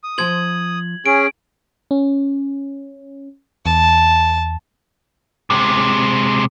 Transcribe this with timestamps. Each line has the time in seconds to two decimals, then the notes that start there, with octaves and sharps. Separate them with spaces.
0.04 D#6
0.18 F3 C5 G#6 F#7
1.06 C#4 G#4 D7
1.91 C#4
3.66 E2 A5
5.50 C3 G#3